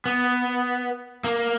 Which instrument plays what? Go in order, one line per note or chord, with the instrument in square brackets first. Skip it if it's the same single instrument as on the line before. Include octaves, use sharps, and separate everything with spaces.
[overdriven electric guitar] B3
A#3